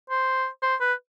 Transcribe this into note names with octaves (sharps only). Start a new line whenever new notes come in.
C5
C5
B4